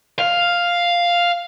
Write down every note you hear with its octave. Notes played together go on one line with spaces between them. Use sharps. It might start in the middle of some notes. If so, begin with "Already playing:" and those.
F5